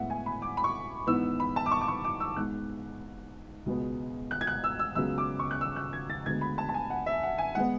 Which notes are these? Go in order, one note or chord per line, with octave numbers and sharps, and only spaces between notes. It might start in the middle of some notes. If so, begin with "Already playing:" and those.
Already playing: A2 G#3 B3 E5 F#5
G#5
B5
D6
B5
C#6
G#2 E3 B3 E6
B5
A5
D6
C#6
D6
C#6
D6
E6
G#2 G#3 B3 F#6
C#2 B2 G#3 B3
F#6
G#6
F#6
E6
E6
C#2 C#3 F#3 B3 E6
D6
C#6
F#6
E6
F#6
G#6
A6
D2 D3 G#3 B3 G#6
B5
A5
A5
G#5
F#5
E5
F#5
G#5
G#3 B3 F#5